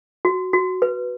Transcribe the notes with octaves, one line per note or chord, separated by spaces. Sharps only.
F#4
F#4
B4